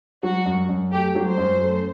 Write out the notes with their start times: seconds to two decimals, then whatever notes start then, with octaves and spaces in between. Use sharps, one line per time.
0.23 F#3 F#4
0.46 F#2
0.69 F#2
0.92 A3 G4
1.15 F#3
1.27 C5
1.38 F#2
1.61 A3